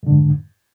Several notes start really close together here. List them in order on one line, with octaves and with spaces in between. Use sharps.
F2 D3 G#2